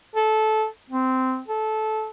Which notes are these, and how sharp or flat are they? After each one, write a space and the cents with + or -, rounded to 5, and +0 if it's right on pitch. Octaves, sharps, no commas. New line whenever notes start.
A4 -15
C4 -15
A4 -15